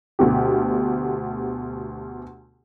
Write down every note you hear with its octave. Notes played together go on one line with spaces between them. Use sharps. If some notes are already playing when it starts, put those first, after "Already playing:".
D2 B2 G4